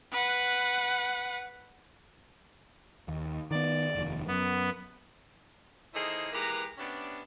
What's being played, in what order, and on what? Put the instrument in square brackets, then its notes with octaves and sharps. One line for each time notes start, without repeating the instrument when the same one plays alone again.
[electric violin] B4 F#5
[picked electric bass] D#2
[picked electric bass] D#3 B3 [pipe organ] D5
[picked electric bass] F1 D#2
[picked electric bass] F#2 [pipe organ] B3
[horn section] E3 A#3 D#4 G#4 A4 C5
E3 G#3 A#3 G4 B4 A#5
C3 B3 C#4 D4